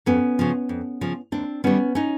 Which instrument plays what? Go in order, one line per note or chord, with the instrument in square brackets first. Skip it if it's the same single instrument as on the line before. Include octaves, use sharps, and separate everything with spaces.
[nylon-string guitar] F2 B3 C#4
C#3 F3
F2
C#3 F3
D#2 C4 D4
D#3 G3 B3 C#4
C#4 D#4